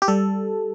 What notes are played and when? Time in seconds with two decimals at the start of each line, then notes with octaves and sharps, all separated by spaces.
0.02 G4
0.08 G3 A4